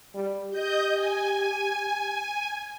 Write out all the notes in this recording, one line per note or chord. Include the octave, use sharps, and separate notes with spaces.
G3
G4 D#5 G6
G#5